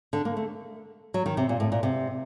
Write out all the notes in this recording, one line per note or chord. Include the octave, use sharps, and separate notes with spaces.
D3
A#3
A3
F#3
D#3
C3
A#2
A2
A#2
C3